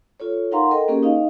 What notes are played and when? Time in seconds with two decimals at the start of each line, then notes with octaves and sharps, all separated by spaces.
0.20 F4 A4 C#5
0.51 D#4 A#4 F5 F#5 A#5 C6
0.71 A4 A#4 D#5 G5
0.88 A#3 C#4 G4 G#4 A#4
1.03 D#4 D#5 F5